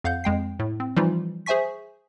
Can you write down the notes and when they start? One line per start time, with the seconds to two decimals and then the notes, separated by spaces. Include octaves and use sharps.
0.04 F2 F5 F#5 G6
0.24 F2 G#3 G5 C7
0.59 A2
0.80 C4
0.97 E3 F3 G3 D#4 F4
1.46 G#4 C5 E5 G#5 C#6 B6